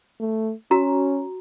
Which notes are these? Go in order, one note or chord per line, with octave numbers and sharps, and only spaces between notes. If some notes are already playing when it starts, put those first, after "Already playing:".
A3
C#4 F#4 A#5